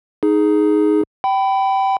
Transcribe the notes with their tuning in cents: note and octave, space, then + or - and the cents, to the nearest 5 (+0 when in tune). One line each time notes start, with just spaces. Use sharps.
D#4 +0 G#4 +10
G5 -20 B5 +15